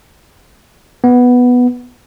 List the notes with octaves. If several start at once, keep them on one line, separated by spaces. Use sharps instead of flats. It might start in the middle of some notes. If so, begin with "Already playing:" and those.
B3